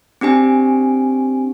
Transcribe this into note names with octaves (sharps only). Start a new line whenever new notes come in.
C4 D4 G4 G#5